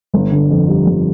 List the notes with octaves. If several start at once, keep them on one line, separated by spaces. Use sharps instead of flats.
G1
D3
F2
G3
G1